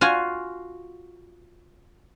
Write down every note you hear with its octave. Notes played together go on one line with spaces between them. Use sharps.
F4 F#4 G#5